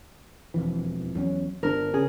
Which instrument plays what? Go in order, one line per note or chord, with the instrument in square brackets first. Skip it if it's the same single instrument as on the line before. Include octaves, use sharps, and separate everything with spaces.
[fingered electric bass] E1 F2 E3
E2 F#3 C#4
[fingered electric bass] G1 D4 [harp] A#4
[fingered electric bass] C#3 C#4 [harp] G#4